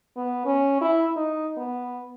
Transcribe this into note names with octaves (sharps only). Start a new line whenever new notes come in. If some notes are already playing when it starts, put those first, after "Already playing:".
B3
C#4
E4
D#4
B3